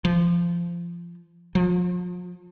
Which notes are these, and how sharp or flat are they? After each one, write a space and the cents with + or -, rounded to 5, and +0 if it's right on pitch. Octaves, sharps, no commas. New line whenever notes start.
F3 -20
F3 +35